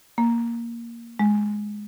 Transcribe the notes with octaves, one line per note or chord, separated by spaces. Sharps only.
A#3
G#3